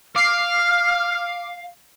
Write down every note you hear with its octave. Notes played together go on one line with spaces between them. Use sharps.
F5 D6 F6 C7